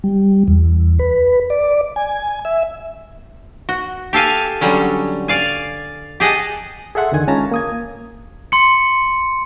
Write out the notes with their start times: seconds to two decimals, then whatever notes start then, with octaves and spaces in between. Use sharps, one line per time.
0.04 G3
0.48 E2
0.99 B4
1.50 D5
1.96 G#5
2.45 E5
3.69 F#4
4.13 G4 A4 F5 G#5
4.61 D3 F#3 G3 C#4
5.28 D5 F5 G#5
6.20 G4 G#4 D#5 F#5 A5
6.95 G#4 A4 E5 F#5 C6
7.12 E2 D3 D#3 G#5 G#6
7.28 G#3 C#4 F4 A5 A#5
7.52 A#3 D#6 G#6
8.52 C6 C#7